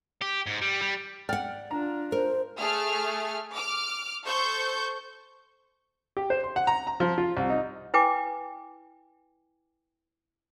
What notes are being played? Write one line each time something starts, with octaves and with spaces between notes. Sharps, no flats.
G4
G#2
G3
G3
D5 F#5 G5 F6
D4 F4 A#5
A#4 C5
A3 G#4 F6
D6 F6
A4 C5 C#6 G6
G4
C5
C6
F#5
A#5
A#5
F3
F4
C2
D#4
E4 B4 G5 G#5 D6